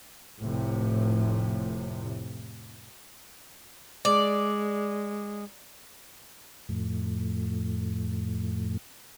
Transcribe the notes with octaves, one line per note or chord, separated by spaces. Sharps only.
F1 A2 C3
G#3 D5
F2 A2